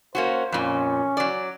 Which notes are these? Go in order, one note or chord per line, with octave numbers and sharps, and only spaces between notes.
A#3 C#4 F#4 C5
F2 A#2 C#4
F#3 D5